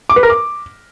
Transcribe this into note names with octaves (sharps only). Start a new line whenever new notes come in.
D6
B4
A#4
D6